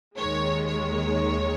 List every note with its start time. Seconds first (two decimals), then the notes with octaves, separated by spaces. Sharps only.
0.18 D#2 D#3 G#3 C#5
0.67 C#5